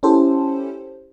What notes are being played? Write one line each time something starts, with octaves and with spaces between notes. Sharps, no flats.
C#4 E4 G4 A4 C5